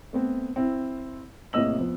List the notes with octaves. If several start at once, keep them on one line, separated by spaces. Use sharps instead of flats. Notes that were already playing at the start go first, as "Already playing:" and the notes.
A3 B3 C4
C4 E4
A2 C3 A#3 D#5 E6 F#7
F2 B3